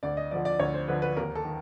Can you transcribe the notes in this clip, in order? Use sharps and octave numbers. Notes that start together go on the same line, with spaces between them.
D2 D5
D#5
D3 F3 D5
D5
D2 C#5
C5
D3 F3 B4
B4
D#2 A#4
A4
D#3